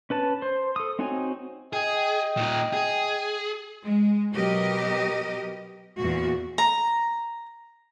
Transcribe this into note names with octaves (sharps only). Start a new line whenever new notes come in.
C#4 B4 A5
C5
A4 D#6
C4 D#4 F#4 C#5 G#5
G#4 D#5 G5
A#2 D#4
G#4
G#3
B2 F#3 G4 A#4 D#5
E2 A#2 F#4
A#5